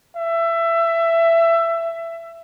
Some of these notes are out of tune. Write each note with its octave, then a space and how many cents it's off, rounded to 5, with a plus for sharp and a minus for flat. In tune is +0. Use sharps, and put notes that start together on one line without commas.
E5 +20